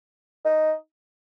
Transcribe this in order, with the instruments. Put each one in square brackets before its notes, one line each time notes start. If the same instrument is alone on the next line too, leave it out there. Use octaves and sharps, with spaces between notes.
[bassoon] D#4